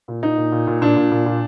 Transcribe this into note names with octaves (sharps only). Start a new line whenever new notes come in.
A#2
A#2 D#4
A#2
A#2
A#2
A#2 D4
A#2
A#2
A#2